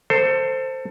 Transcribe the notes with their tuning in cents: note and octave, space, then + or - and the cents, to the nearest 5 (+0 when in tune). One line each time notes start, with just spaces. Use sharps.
A4 +25 C5 +0